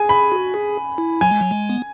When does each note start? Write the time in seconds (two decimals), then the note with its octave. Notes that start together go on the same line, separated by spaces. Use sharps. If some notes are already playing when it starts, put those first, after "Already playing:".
Already playing: G#4 G#5
0.09 B5
0.32 F#4
0.54 G#4
0.98 E4
1.21 F#3 G#5
1.31 G#3
1.41 F#3
1.51 G#3
1.70 B3